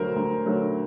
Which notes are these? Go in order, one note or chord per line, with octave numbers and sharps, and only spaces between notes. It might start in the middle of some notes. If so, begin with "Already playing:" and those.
Already playing: D2 D3 F#3 A3 A#4 C5
D2
D3 F#3 A3